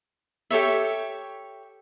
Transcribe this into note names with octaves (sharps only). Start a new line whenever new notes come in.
G4 A4 C#5 E5